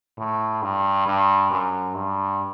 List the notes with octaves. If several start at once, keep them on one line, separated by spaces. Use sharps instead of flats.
A2
G2
G2
F#2
G2